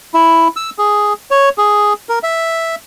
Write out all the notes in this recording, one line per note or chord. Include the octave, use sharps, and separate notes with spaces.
E4
E6
G#4
C#5
G#4
A#4
E5